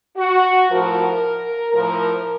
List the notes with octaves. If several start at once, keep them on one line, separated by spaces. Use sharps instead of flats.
F#4
A2 F3 A#4
A2 F3 A#4